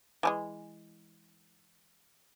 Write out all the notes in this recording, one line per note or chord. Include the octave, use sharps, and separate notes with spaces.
E3 F3 G#3